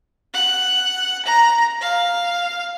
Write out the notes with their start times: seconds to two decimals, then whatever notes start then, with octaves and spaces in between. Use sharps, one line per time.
0.34 F#5
1.26 A#5
1.81 F5